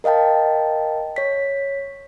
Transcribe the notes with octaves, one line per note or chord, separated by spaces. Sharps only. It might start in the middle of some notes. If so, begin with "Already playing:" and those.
A#4 D#5 F5 G5 A5
C#5 B6